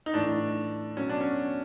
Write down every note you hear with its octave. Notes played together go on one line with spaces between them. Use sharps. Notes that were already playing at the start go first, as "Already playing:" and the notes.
D#4
A2 E3 D4
B2 F#3 C#4
D4
C#4